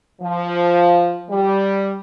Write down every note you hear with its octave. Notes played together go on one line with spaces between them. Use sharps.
F3
G3